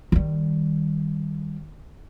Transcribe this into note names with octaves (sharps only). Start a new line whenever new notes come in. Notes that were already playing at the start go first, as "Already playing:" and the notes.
D#3 G3